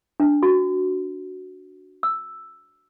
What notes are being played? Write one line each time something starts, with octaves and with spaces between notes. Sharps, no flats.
D4
F#4
E6